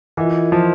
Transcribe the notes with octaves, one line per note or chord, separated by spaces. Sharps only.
E3 F4 A#4 D#5 F#5
F3